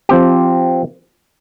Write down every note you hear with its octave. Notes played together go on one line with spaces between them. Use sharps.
F3 C4 G4